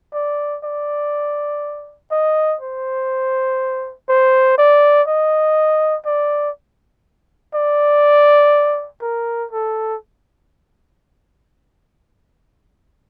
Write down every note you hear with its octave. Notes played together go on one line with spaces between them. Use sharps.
D5
D5
D#5
C5
C5
D5
D#5
D5
D5
A#4
A4